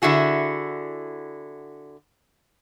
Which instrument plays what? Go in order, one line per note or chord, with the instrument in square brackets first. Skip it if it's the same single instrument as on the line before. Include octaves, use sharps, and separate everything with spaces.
[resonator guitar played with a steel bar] D3 E4 F#4 G#4